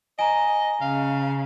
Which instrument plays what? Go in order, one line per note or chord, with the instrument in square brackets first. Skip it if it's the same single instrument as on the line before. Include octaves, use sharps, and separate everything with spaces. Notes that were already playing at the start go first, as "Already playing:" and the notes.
[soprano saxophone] D#5 [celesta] G#5 A#5
[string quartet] C#3 [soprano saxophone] F5